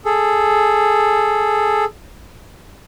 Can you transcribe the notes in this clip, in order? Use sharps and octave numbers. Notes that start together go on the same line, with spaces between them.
G#4 A4